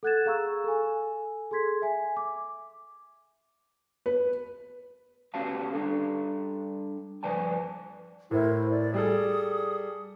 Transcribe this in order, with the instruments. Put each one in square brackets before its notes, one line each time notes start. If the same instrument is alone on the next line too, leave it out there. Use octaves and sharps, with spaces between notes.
[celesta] A4 F#5 F#6 G#6 A6 E7
G#4 F5 A#5 C#6 E6
A4 G#5
G#4 A4 C6 G#6 B6
E5 G#5
D6
[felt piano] B4
[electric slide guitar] B3 C#4 F#4 G4 F5 A5
G3 D4 A4
G2 F3 B4 D5 G#5 A5
[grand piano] A2 [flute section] E4 A#4 C5
[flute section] D5
[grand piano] G3 G#4 A4 [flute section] D#6